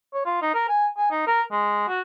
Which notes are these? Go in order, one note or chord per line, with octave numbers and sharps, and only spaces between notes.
C#5
F4
D#4
A#4
G#5
G#5
D#4
A#4
G#3
F#4